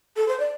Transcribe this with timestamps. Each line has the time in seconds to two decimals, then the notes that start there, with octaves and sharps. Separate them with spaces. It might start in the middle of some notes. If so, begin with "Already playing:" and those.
0.16 A4
0.28 C5
0.40 D5